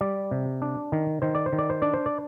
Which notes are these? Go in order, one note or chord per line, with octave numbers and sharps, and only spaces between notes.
G3 D5
C3
D4
D#3
D#3 C5
D5
C5
D#3
D5
C5
D4 D5
C5
D5